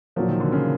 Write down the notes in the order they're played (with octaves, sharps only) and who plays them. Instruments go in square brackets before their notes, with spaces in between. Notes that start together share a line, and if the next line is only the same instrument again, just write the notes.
[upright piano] A#2 F#3 A#3 [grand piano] F3
[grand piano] D#3
D3
C#3